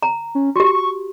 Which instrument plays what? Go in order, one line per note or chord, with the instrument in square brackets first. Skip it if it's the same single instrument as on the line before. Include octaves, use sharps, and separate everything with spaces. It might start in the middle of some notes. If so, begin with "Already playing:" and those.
[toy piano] A#5
[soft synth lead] C#4
[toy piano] F#4 G4 [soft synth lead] C#6